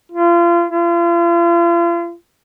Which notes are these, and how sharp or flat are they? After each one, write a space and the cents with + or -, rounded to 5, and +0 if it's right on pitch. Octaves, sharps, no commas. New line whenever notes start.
F4 -30
F4 -40